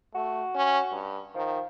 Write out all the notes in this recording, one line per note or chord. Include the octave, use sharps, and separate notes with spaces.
A3 F#4
C#4
G2
D#3 F3